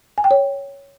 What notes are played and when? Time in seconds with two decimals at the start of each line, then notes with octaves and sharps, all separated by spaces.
0.18 G#5
0.24 G5
0.31 C#5